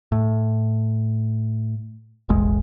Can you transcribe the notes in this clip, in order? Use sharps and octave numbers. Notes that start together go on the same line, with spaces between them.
A2
E1 A1 G#3